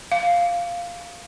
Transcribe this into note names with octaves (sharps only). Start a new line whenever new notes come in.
F5